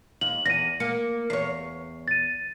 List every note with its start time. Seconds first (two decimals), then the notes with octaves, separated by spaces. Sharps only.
0.21 D#2 F#7
0.46 E2 A#6 D#7
0.80 A#3 C#7
1.30 E2 C#5 C7
2.08 A6 D#7